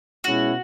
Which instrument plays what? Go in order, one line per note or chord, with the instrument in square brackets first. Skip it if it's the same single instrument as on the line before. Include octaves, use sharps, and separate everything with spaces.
[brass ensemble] B2 G#3 C#4 E4 [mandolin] F#4